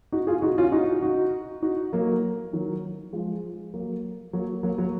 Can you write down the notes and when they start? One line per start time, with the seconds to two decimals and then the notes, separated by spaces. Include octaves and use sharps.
0.12 D#4 F#4
0.27 F4 G#4
0.42 D#4 F#4
0.58 C#4 F4
0.72 D#4 F#4
1.03 D#4 F#4
1.62 D#4 F#4
1.93 F#3 A#3
2.53 D#3 F#3
3.13 F3 G#3
3.74 F#3 A#3
4.33 F#3 A#3
4.63 F#3 A#3
4.78 F#3 A#3